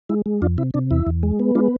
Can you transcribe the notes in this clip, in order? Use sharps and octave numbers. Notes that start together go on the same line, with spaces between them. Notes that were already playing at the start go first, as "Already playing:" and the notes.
G#3 E4
G#3
F2 D4 F4
C3 E4
C3 D4
E2 E4
E2
G#3
B3
G#3 D4 F4